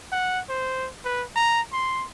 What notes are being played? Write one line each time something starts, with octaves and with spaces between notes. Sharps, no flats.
F#5
C5
B4
A#5
C6